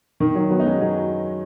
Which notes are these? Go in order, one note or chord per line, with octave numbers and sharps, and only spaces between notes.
D#3
F#3
F#3 B3
D#4
G#3 C#4
F#3